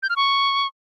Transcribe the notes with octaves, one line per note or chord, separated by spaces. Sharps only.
G6
F6
C#6